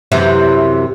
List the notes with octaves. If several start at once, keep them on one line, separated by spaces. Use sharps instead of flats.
F#2 C3 E3